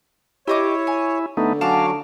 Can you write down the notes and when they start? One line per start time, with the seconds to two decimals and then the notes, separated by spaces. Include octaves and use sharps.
0.48 E4 G4 C#5 D#5 D6
0.87 G#5
1.37 D3 A3 B3 D#4
1.61 F#3 C#4 F#4 F5 A5 D6